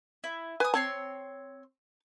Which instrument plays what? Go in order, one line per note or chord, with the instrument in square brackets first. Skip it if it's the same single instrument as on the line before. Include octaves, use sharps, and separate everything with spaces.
[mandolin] E4
[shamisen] B4 [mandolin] G#5 D#6
[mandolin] C4 C#5 C6 [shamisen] A5